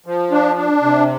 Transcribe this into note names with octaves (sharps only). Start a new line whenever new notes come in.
F3
D4
D4
C3